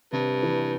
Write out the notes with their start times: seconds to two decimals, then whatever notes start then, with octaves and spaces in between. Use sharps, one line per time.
0.12 G2 C3
0.43 E3